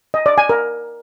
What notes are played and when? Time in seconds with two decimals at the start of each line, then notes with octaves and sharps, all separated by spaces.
0.14 D#5
0.26 D5
0.38 G#5
0.49 A#4